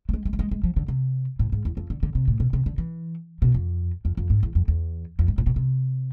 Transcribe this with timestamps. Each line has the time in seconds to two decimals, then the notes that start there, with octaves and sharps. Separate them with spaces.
0.09 A3
0.13 G#3
0.25 G#3
0.33 A3
0.39 G#3
0.51 G#3
0.63 F3
0.76 D3
0.88 C3
1.39 A2
1.52 G#2
1.65 E2
1.77 F2
1.90 D3
2.03 D3
2.15 C3
2.28 A2
2.40 B2
2.53 C3
2.66 D3
2.78 E3
3.42 B2
3.54 F2
4.05 F2
4.17 F2
4.30 G#2
4.43 E2
4.55 F2
4.68 E2
5.19 F2
5.28 G#2
5.38 A2
5.46 B2
5.56 C3